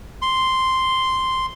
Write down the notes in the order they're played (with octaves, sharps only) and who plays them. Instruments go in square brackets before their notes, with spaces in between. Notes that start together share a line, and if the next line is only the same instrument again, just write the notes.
[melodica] C6